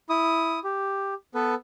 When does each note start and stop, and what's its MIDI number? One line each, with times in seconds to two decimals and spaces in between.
0.10 0.59 64
0.10 0.59 87
0.64 1.14 67
1.35 1.55 59
1.35 1.55 69
1.35 1.55 71